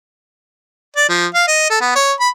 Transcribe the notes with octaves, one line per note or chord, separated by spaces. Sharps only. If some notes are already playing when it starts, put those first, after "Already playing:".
D5
F3
F5
D#5
A4
B3
C#5
B5